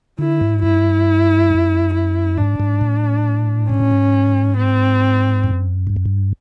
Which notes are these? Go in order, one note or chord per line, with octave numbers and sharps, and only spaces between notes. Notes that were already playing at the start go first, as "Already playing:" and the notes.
D3 E4
G#2
G2 E4
F#2
E4
G#2 D4
G#2
A2
G#2 C#4
A2
G#2
C4
F#2
G2
F#2
G2